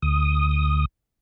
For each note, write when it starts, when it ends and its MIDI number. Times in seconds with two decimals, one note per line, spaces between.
0.02 0.85 38
0.02 0.85 87